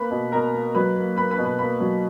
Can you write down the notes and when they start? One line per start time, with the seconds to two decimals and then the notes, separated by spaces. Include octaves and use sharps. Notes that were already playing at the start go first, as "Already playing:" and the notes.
Already playing: A#3 B4 B5
0.11 B2
0.32 B2 A#4 A#5
0.54 A#3
0.75 F#3 B4 B5
0.96 A#3
1.16 A#3 B4 B5
1.31 B4 B5
1.38 B2
1.45 B4 B5
1.59 A#3 B4 B5
1.80 F#3